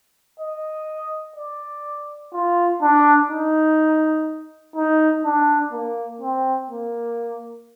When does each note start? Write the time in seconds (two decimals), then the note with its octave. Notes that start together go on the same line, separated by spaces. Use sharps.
0.40 D#5
1.36 D5
2.33 F4
2.82 D4
3.31 D#4
4.76 D#4
5.25 D4
5.72 A#3
6.21 C4
6.70 A#3